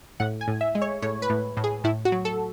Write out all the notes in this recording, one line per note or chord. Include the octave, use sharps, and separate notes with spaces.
A2 F#5
G#5
A2
E5
G#3
C#5
A2 C#5
B4
A2
A2
G#4
A2 E4
F#4
F#3
A4